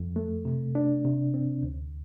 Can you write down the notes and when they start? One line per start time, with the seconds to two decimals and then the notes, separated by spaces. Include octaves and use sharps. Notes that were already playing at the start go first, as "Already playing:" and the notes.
Already playing: F2
0.16 A3
0.45 C3
0.75 D4
1.05 C3
1.34 C4
1.63 D2